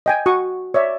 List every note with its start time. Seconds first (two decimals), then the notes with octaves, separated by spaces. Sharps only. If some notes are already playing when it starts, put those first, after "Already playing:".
0.06 D#5 G5 G#5
0.26 F#4 C#6 D#6
0.74 C#5 D5 E5